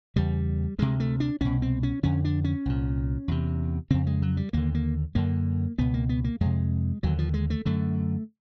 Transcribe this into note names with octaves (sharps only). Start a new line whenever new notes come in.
E2 C#3 G3
D2 C3 G#3
A3
D4
C2 B2 C#4
C4
C#4
F2 D3 C#4
D4
C#4
C2 A#2
E2 C3
F2 C#3 C4
G#3
F#3
G3
D#2 D3 A#3
A#3
F#2 D3 A#3
C#2 B2 B3
A#3
B3
A#3
F2 C3 G#3
D#2 D3 F#3
F3
G#3
A3
F#2 D3 A3